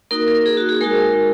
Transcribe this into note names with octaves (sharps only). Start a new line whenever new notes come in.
A#3 D#4 F#4 A#4
A#4
G#4
F#4
G#4
G#3 D#4 F#4 A#4